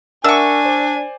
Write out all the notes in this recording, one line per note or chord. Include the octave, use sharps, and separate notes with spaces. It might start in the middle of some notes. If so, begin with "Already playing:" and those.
D4 A#4 E5 F#5 G#5 C#6 E6
C5 D5